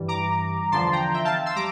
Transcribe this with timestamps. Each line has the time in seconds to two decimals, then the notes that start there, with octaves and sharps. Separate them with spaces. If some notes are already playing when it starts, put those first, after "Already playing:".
Already playing: G2 E3 G3
0.08 A#5 D6
0.72 E2 D3 F3 A5 C6
0.93 G5 A#5
1.14 E5 G5
1.24 F5 A5
1.46 C6 E6
1.56 G3 A#5 D6